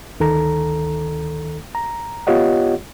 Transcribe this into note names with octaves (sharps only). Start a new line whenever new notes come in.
D2 D#3 A4 A#5
A#5
B3 F4 G4 C#5 D#5 F#5